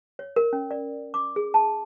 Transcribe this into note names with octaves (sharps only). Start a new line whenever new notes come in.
C#5
A#4
C#4
D5
D6
G#4
A5